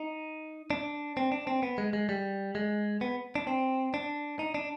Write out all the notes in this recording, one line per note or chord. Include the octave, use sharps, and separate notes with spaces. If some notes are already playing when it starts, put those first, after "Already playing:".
Already playing: D#4
D4
C4
D4
C4
B3
G#3
G#3
G3
G#3
B3
D4
C4
D4
D#4
D4